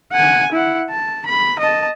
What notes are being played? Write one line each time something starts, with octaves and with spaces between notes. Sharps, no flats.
F#5 G#5
E4 F#5
A5
B5
D#5 A5